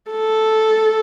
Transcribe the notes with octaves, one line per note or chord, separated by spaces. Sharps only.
A4